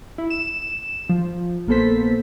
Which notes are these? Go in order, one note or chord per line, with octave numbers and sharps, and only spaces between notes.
E4
E7
F3
A#1 A#3 B3 A4 C5 B6